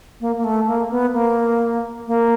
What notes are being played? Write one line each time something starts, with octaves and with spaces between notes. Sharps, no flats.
A#3
A#3
A3
A#3
B3
A#3
A#3